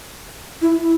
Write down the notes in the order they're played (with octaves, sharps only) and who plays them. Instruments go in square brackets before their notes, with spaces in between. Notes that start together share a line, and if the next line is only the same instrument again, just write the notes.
[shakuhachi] E4
E4